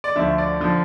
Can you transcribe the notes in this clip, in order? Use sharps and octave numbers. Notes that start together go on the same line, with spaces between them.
D5
D2 D3 F3 E5
D5
D3 F3